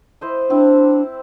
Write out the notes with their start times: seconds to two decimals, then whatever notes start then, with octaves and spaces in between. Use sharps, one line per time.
0.21 E4 C5 D#5
0.50 C4 D4 E4